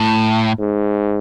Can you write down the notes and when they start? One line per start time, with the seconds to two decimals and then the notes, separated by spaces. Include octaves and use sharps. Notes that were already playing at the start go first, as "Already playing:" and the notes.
Already playing: A2
0.59 G#2